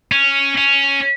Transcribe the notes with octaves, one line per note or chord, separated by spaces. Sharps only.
C#4
C#4